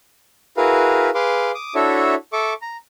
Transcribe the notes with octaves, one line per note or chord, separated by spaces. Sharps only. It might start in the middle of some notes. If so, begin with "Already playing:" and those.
E4 F#4 G#4 A#4 B4 F5
G#4 B4 F5 C6 D6
D6 D#6
D4 E4 F#4 A4 C#5 E5
A4 E5 C#6 D6
A#5